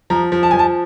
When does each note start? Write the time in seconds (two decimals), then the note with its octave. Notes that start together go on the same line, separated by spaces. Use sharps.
0.10 F3 A#5
0.32 F3
0.43 A5
0.51 F3 G#5
0.59 A5